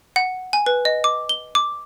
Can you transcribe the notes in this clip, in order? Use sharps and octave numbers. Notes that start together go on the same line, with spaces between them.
F#5
G#5
B4
D#5
D6
G7
D6